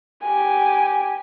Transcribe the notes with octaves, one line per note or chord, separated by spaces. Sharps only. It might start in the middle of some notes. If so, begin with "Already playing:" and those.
G4 G#5